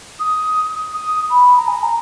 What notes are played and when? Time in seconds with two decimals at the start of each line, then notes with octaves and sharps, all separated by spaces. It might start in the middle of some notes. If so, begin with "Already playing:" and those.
0.19 D#6
0.93 D#6
1.30 B5
1.57 A#5
1.67 G#5
1.83 A#5